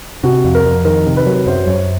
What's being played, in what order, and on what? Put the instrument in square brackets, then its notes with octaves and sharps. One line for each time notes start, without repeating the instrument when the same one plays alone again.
[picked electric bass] C3 [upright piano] F#4
[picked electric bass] F2
[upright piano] A#4
[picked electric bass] F2
[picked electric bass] D#3 [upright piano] A#4
[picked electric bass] C3
[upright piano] B4
[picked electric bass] F#3
[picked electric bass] F#2 [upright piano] C5
[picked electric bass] F#2 [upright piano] C#5